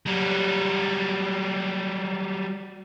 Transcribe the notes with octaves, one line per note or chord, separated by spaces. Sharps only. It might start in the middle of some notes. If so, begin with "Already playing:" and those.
F#3 G3